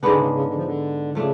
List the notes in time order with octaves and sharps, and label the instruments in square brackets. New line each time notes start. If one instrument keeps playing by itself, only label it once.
[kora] G#2 G#3 B3 D4 [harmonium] D3
[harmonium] C#3
C#3
D3
F3
D3
[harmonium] C#3 [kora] F3 A3 D4